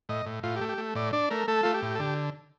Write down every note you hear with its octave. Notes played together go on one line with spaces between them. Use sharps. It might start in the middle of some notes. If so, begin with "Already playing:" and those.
A2 D#5
A2
A2 F4
G4
A3
G4
A3
A2 D5
D4 D5
A3 A#4
A3 A4
A3 F4
G4
A2
A4
D3 G4